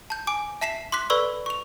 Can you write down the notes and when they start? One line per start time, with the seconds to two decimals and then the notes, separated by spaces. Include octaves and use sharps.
0.10 A5 G6
0.27 G#5 D6 D7
0.61 E5 A5 B6 C7 E7
0.92 C6 D6 F#6 B6
1.10 A4 B4 D5 B5 C#6 E6
1.46 C#6 F7